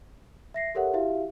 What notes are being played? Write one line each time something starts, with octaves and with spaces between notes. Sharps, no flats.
E5 A#6 C7
G4 A4 A#4 C#5 E5 F#5
E4 F#4 G4 E5 F5